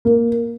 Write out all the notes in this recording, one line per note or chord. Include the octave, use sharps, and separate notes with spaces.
A#3